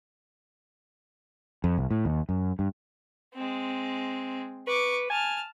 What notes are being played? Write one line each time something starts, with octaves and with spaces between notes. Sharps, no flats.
F2
C2
A2
D#2
F#2
G2
G#3 C4
B4 C#6 D6
G#5 A5 F6